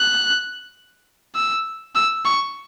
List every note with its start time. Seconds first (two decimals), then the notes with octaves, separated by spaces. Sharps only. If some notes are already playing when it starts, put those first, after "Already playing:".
Already playing: F#6
1.35 E6
1.95 E6
2.25 C#6